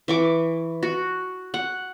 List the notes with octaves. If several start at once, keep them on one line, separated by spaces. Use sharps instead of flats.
E3 C#6 D6
F#4
F#5